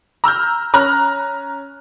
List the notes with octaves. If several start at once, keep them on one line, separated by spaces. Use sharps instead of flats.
A#5 E6 F6 G6
C#4 A#5 F6 F#6